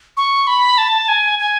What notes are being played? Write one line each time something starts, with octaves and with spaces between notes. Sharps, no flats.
C#6
B5
A5
G#5
G#5